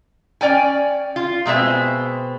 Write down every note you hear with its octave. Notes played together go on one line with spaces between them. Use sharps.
C#4 D5 G5 G#5
F4
B2 G#3 C4 E5 G#5